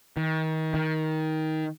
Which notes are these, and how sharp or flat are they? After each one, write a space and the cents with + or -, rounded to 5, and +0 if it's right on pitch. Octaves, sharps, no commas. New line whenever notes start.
D#3 +30
D#3 +15